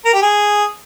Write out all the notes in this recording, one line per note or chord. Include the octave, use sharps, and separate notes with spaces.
A#4
G4
G#4